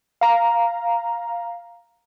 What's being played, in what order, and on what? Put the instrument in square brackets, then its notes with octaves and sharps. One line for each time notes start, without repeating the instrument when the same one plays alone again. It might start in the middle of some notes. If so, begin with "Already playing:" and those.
[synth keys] F5 A#5